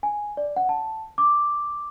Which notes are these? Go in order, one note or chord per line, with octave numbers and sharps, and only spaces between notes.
G#5
D5
F#5
A5
D6